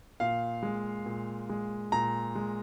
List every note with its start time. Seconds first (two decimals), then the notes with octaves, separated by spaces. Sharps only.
0.20 A#2 F5
0.63 G#3
1.06 A#2
1.49 G#3
1.92 A#2 A#5
2.35 G#3